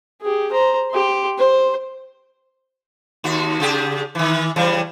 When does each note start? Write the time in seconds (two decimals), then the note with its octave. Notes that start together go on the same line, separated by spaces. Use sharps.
0.21 G4 G#4
0.51 C5 A#5
0.91 G4 C6
1.38 C5
3.24 D#2 F#4
3.60 C#3 G4 G#4
4.15 D#3 E3
4.56 C#3 E3 G3